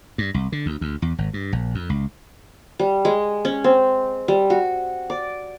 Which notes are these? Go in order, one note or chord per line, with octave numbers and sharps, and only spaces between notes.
G2
C2
D3
D2
D2
E2
G#1
G2
A#1
F2
C#2
G3
G#3
C#4
C4
G3
F#4
D5